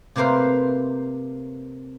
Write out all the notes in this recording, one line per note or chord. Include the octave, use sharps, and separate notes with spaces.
C3 A3 A#3 B4 C5 F5